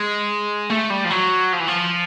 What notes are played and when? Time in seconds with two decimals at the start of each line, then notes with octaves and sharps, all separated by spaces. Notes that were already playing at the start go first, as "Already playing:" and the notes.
Already playing: G#3
0.70 A3
0.90 G3
1.05 F3
1.10 F#3
1.53 F3
1.60 E3
1.68 F3